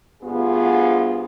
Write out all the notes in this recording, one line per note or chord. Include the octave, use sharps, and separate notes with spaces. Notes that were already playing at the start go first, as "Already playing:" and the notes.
D2 G2 B3 F4 G#4